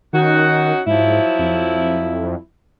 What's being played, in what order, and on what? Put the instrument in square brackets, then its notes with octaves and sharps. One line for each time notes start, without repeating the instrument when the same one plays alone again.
[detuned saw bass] D#3 [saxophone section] C#4 D#4 F#4
[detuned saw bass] G#2 [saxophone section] F3 F#3 E4
[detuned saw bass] F2